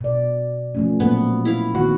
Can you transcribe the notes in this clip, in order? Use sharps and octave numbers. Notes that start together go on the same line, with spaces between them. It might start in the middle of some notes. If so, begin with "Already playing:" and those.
B2 D5
F3 A3 C#4
A#2 F#3 A#3 B3
E4 F5
D#3 B3 F#4